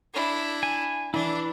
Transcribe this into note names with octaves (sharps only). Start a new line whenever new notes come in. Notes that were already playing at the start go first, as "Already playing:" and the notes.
D4 E4
G#5
E3 D4 E4